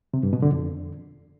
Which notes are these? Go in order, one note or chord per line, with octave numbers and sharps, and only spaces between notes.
C3
G2
B2
D3
F2